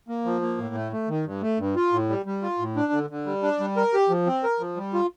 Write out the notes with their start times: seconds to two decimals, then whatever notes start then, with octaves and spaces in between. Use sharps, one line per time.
0.08 A#3
0.25 F3
0.42 A#3
0.58 A2
0.75 A3
0.92 A3
1.09 D#3
1.25 G2
1.42 A3
1.58 G2
1.76 F4
1.93 A2
2.09 G3
2.26 G3
2.42 F4
2.59 A2
2.76 D4
2.93 D3
3.10 D3
3.26 G3
3.43 D4
3.60 G3
3.77 A#4
3.94 G4
4.10 F3
4.27 C4
4.43 A#4
4.60 F3
4.77 G3
4.94 F4